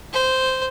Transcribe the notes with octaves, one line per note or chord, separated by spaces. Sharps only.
C5